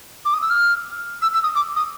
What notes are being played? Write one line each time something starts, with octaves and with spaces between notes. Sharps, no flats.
D6
D#6
E6
F6
E6
E6
D#6
D6
D#6